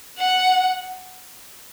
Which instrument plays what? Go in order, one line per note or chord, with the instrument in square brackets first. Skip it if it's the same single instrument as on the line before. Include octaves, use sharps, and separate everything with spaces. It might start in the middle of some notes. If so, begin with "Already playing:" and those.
[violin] F#5